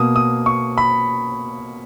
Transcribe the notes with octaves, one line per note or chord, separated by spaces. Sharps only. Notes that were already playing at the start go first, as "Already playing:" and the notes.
Already playing: B2 A#3 D#6
D#6
C#6
B5